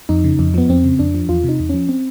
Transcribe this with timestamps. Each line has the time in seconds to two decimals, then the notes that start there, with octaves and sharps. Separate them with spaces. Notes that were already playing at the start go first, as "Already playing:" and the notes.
0.09 F2 D#4
0.24 C#3
0.39 F2
0.54 F3 B3
0.69 F2 C4
0.84 C#3
0.99 F2 D4
1.15 F3
1.29 E2 F4
1.44 C3 D#4
1.60 E2
1.69 F3 C#4
1.89 C4